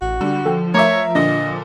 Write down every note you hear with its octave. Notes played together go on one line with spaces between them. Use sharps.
A1 F#4
D3 G3
F3 A4 G5
A3 A#4 C#5 E5 A#5 D6
A#2 D3 D4 D#5